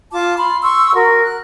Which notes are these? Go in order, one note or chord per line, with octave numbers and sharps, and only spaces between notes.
F4 A5 D6
B5 C6
C6 C#6 E6
F#4 A#4
F#6